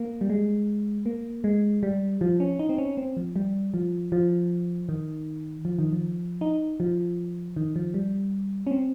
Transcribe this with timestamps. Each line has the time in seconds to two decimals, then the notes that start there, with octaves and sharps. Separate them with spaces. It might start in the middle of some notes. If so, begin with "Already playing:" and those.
Already playing: A#3
0.21 G3
0.30 G#3
1.06 A#3
1.44 G#3
1.83 G3
2.21 F3
2.40 C#4
2.59 D#4
2.69 C4
2.78 C#4
2.97 C4
3.17 F3
3.36 G3
3.74 F3
4.12 F3
4.89 D#3
5.65 F3
5.79 D#3
5.93 F3
6.41 D#4
6.80 F3
7.56 D#3
7.76 F3
7.94 G3
8.67 C#4
8.71 C4